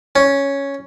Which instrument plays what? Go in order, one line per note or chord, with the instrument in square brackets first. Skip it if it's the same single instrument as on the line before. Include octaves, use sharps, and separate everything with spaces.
[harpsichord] C#4